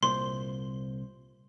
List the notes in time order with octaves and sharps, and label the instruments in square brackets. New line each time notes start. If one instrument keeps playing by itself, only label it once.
[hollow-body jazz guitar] C2 A#2 C5 [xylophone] C6